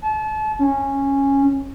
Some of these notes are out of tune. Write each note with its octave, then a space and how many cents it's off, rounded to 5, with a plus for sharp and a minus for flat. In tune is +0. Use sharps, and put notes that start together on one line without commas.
A5 -35
C#4 -10